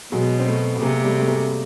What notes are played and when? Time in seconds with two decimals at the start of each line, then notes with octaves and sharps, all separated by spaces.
0.12 B2 F#3 G#3
0.39 C4
0.46 A3 B3
0.75 B3
0.81 C3 G#3 A#3
1.04 G3 A3
1.20 A3
1.28 G#3 A#3